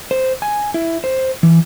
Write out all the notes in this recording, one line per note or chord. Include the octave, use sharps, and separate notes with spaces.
C5
G#5
E4
C5
E3